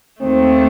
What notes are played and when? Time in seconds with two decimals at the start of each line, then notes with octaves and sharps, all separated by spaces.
0.21 D#2 D#3 A3 C4